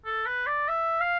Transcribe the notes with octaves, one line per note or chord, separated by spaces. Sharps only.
A4
B4
D5
E5
F5